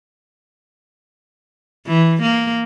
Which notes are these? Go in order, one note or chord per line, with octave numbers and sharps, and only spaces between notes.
E3
A#3